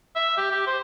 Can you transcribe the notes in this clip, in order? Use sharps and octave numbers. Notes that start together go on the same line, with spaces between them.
E5
G4
G4
C5